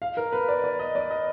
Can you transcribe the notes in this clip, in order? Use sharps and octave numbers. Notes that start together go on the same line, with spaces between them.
F5
A#4
B4
D5
D5
D#5
D5
D#5